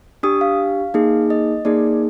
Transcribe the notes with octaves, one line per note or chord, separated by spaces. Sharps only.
D4 G4 D#6
F5
A#3 D#4 G#4
D#5
A#3 D#4 G#4 D5